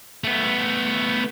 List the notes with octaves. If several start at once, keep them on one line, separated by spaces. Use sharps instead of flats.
A3 B3